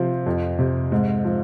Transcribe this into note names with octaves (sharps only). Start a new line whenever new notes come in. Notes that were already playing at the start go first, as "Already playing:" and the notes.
Already playing: C3 F3
F2
C3
G#2
F3